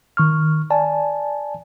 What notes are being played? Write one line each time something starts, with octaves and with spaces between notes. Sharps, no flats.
D#3 C#6 F6
D5 G#5 A5